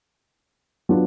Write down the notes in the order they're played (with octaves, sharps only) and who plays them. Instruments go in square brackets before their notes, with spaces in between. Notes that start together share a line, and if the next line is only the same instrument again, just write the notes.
[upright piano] F#3 B3 D4 F4